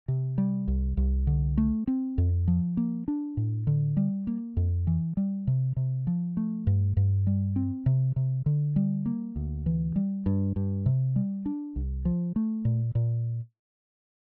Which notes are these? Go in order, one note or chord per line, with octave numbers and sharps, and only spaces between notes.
C3
G3
C2
C2
D3
A3
C4
F2
F3
A#3
D4
A2
D3
G3
A#3
F2
E3
G3
C3
C3
F3
A3
G2
G2
G3
C4
C3
C3
D3
G3
A#3
D2
E3
G3
G2
G2
C3
G3
D4
C2
F3
A3
A#2
A#2